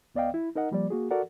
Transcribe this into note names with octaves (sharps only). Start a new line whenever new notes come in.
C#2 B3 D5 D#5 F5 G5
E4
D#4 A#4 D#5 F#5
F3 G3 A#3 D5
A#3 F#4 G#4
F#4 A4 A#4 D5 F#5